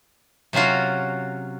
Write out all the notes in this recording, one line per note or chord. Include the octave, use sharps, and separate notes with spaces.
C3 F#3 C#4 F4 F#4